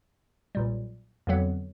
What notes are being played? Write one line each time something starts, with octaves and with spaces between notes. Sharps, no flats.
B1 A#2 G3
F2 D3 F#3 B3